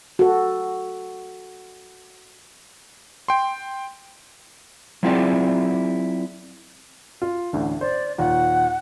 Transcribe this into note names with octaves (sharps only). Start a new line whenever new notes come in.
F#4 A4
G5 C6
F#3 C4 E4 F4 G#4 D5
F4
A1 D2 D3
C5 D5
D#2 A#2 F#5